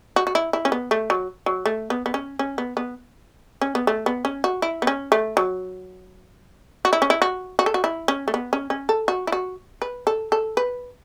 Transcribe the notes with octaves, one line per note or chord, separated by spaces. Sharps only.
F#4
F#4
E4
E4
C#4
B3
A3
F#3
F#3
A3
B3
B3
C#4
C#4
B3
B3
C#4
B3
A3
B3
C#4
F#4
E4
B3
C#4
A3
F#3
F#4
E4
C#4
E4
F#4
F#4
A4
F#4
E4
C#4
A3
B3
C#4
C#4
A4
F#4
E4
F#4
B4
A4
A4
B4